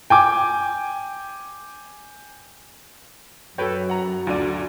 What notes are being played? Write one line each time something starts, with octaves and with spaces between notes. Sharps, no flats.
G5 G#5 D6
F#2 F#4 A4 B4 C#5 G5
F#5 A#5
D2 D3 F4 D5 D#7